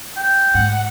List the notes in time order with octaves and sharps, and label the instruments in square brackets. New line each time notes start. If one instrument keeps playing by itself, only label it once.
[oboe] G5
[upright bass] G#2 [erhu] F#5